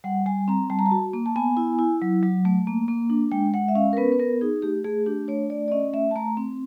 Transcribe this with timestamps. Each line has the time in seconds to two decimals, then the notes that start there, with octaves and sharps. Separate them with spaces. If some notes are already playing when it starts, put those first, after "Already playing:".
0.04 G3 F#5
0.26 G3 G#5
0.48 C4 A#5
0.70 G3 A5
0.79 A#5
0.86 A5
0.91 F#4
1.13 A#3
1.26 A5
1.36 B3 G#5
1.57 E4
1.79 E4
2.02 F#3
2.23 F#3
2.45 A3
2.67 A#3
2.88 A#3
3.10 D4
3.32 G#3 G5
3.54 G#3 F#5
3.68 E5
3.75 C#4 F5
3.93 A#4
3.97 B3 B4
4.12 B4
4.19 B3 A#4
4.41 D#4 G#4
4.62 A3 G4
4.84 A3 G#4
5.06 D4 G4
5.28 A3 C#5
5.50 A3 D5
5.68 D5
5.71 C#4 D#5
5.93 A3 E5
6.11 A5
6.16 A3 A#5
6.37 C4